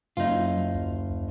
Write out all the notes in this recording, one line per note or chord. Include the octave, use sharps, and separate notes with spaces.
F#1 F#3 D#4 F4
D2